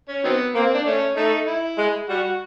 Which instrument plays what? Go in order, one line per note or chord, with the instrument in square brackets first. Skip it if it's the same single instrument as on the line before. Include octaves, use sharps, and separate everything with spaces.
[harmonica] C#4
[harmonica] D#3 F#3 B3 [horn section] C4
[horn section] A#3 [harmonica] C4
[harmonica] D4
[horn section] A3 [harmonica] C#4
[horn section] A3 [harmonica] D#4
[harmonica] E4
[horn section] G#3
[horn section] G3 [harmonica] F#4
[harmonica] F#4